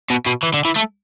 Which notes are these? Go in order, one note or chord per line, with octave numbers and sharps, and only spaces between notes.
B2
B2
E3
D3
E3
A3